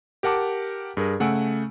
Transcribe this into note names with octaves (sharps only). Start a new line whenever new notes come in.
G4 A#4 F#5 A5 D6
G2 G#4 A#4
C#3 A3 F#5 G#5 E6 D7